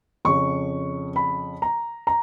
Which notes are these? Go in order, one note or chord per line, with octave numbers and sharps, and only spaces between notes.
F2 C#3 C#6
B5
A#5
A#5